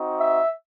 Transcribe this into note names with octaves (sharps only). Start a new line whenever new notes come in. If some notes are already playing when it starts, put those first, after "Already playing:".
Already playing: C4 D#4 F#4
E5